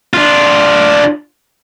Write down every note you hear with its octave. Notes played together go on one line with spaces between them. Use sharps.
D4 F4